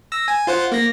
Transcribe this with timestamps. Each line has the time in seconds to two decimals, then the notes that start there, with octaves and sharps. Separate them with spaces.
0.12 E6 A#6
0.28 G#5
0.47 F4 C5 F#5
0.72 A#3 A#6